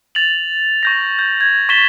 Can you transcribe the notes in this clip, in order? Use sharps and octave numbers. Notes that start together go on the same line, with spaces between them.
A6 F7 F#7
C#6 G6 A#6
G6
G#6
C#6 A6 B6 E7 G7